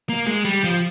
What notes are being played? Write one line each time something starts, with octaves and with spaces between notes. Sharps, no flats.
A#3
G#3
G3
F3